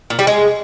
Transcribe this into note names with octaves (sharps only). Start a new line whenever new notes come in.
A#2
G3
G#3